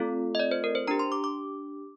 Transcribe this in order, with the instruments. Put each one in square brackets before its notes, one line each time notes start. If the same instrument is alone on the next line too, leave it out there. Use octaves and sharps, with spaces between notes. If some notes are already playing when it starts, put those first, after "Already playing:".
Already playing: [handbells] A3 C4 F4 A4
D#5
D5
C5
A#4
C5
D4 G4 A#5
C6
D6
D6